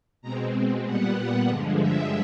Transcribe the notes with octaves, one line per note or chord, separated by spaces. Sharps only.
B2 G#3 C4 A#5
A#2 G3 B3 F#5
G2 D3 F3 G#3
E5